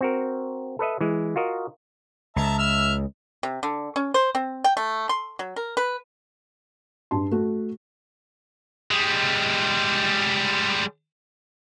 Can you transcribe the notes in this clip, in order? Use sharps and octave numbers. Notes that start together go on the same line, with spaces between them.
C4 F#4 A#4
A4 B4 D#5 E5
E3 G#3
F4 F#4 A#4 D#5
C#2 E5 A5 A#5
E5 E6 F6
C3
D3
C#4
C5
C4
G5
A3
C6
F#3
A#4
B4
G2 A5 C6
A3 F#4
G3 G#3